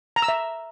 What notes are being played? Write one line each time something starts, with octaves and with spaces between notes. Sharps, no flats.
A#5
E6
E5